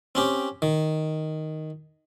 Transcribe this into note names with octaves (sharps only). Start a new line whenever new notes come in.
C4 C#4 G4
D#3